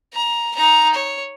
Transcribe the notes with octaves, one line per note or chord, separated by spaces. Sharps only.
A#5
D#4 A#5
C#5